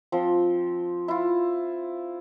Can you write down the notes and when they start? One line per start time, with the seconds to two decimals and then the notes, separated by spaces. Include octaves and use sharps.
0.12 F3 C4
1.08 E4 F4